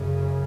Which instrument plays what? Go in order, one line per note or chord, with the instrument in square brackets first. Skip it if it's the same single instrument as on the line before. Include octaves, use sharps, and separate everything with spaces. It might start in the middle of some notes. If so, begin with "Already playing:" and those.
Already playing: [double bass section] F#2 C#3